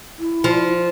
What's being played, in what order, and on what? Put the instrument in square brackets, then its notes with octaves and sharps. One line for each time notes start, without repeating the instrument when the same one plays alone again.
[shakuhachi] E4
[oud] F3